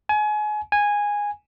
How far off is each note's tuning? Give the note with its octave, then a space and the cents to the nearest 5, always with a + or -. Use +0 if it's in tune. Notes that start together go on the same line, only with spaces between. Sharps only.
G#5 +30
G#5 -10